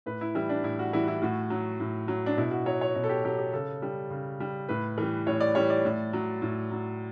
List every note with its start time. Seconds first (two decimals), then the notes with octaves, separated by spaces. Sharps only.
0.06 A2 B4
0.21 E4
0.35 E3 G3 E4
0.49 D4
0.64 A2 E4
0.79 F#4
0.93 E3 G3 E4
1.08 E4
1.22 A2 F#4
1.50 F#3
1.80 A2
2.08 F#3
2.26 D4
2.37 B2 E4
2.51 F#4
2.66 F#3 C#5
2.81 C#5
2.95 B2
3.04 A4
3.09 G4
3.25 F#3 G4
3.39 G4
3.53 C#3 A4
3.82 G3
4.10 C#3
4.40 G3
4.69 A2 B4
4.98 E3 G3
5.27 A2 C#5
5.40 D5
5.55 E3 G3 C#5
5.70 D5
5.85 A2
6.13 F#3
6.42 A2
6.71 F#3